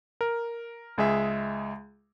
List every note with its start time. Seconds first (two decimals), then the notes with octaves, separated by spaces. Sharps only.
0.21 A#4
0.98 C#2 G#3 G#4 E5